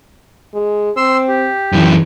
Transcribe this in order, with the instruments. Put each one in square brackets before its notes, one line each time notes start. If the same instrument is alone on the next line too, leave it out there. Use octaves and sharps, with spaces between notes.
[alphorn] G#3
[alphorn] C4 [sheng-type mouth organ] C6 E6
[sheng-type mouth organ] G4
[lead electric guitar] F#2 E3 [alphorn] C#3